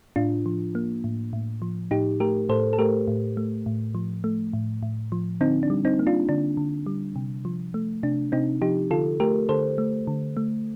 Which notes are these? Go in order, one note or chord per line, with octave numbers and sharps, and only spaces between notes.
A2 D4 F4
F3
A#3
A2
A2
F3
A2 D#4 G4
A3 G4 A#4
A2 A4 C5
A4
A3 G4 A#4
A2
A3
A2
F3
A3
A2
A2
F3
D3 C4 D#4
D4
G3
C4 D#4
A#3
D4 F4
D3 D4
D3
G3
C3
F3
A3
C3 D4
C3 C4 D#4
F3 D#4 G4
D3 F4 A4
A3 G4 A#4
D3 A4 C5
A3
D3
A3